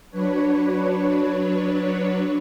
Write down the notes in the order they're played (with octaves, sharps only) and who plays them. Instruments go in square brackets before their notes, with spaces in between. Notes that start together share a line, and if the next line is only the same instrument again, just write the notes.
[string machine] F#3 D4 B4 C#5